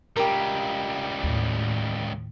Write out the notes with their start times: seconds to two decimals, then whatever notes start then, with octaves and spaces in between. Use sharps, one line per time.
0.17 C#2 G3 G4 A#4
1.23 D#2 A2